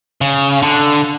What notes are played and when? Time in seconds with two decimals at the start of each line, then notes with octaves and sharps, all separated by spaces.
0.21 C#3
0.62 D3